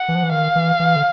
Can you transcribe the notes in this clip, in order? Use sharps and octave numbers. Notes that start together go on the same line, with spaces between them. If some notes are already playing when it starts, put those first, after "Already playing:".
Already playing: F#5
E3
F3
E3
D#3 F5
E3
E3
D3